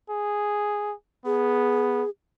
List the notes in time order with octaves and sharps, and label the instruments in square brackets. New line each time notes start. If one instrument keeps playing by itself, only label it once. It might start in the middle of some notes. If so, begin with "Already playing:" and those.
[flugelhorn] G#4
[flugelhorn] B3 [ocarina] G#4